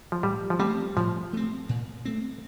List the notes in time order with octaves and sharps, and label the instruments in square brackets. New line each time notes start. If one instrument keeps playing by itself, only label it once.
[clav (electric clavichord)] F3
[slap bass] A2 [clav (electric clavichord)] G3
[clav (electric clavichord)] F3
[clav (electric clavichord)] G3 [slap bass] A3 C4
[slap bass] A2 [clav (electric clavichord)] F3
[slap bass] A3 C4
A#2
A3 C4